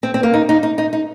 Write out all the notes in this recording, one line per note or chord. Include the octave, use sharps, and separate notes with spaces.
C4
C4
A#3
D#4
D#4
D#4
D#4
D#4